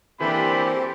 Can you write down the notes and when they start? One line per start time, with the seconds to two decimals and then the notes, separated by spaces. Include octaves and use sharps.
0.20 E3 A#3 C4 D4 G4 A4 C5 B5